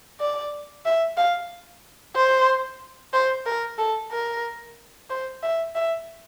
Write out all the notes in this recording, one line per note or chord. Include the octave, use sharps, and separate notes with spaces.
D5
E5
F5
C5
C5
A#4
A4
A#4
C5
E5
E5